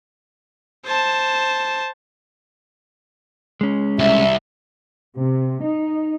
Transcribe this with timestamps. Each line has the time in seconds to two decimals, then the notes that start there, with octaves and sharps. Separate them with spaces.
0.86 C5 A5
3.61 G#3 C#4
3.99 C2 E5
5.16 C3
5.63 D#4